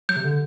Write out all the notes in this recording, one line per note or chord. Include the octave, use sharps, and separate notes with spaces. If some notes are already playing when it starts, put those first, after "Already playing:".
F#3 G6
C3
D3